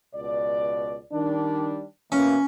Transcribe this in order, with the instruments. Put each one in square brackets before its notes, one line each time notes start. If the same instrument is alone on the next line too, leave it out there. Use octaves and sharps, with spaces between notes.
[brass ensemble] C#2 B2 D5
D#3 G3 D4
[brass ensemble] B2 E3 A#3 [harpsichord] C#4